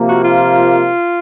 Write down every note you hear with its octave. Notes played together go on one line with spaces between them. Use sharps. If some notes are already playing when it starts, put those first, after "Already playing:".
Already playing: C3 F3 A#3
F#4
F4